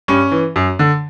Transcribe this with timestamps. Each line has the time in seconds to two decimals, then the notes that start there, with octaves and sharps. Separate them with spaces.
0.08 G2 C#4
0.31 E3
0.56 F#2
0.79 D3